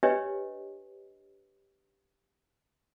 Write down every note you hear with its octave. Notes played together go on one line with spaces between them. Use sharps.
D4 G4 B4 C#5 D#5